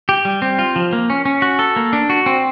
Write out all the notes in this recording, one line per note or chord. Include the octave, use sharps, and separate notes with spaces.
G4
G3
C4
F4
F3
A#3
C#4
C#4
F#4
A4
A#3
D4
F#4
C4